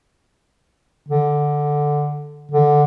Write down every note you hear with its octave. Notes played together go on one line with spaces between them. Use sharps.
D3
D3